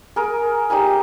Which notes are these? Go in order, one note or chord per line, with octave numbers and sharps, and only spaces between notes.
G#4 A#4
D#4 G4 G#5 A#5